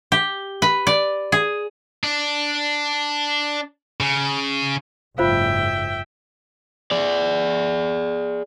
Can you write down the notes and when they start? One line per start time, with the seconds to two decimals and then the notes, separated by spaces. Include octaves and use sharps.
0.12 G4
0.62 B4
0.87 D5
1.32 G#4
2.04 D4
4.01 C#3
5.18 F#1 G#2 F4 C5 E5 F5 G5
6.91 G#4 D5